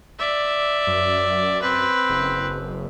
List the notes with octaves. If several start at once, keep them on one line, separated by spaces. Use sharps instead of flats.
D5 E5
F#2
C4 B4
F#1